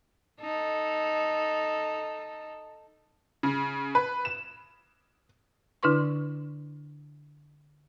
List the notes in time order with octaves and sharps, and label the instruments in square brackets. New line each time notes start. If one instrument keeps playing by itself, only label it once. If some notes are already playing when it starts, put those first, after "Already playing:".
[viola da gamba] D#4 A4
[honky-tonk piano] C#3
B4
E7
[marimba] D3 D4 E4 B4 C6 C#6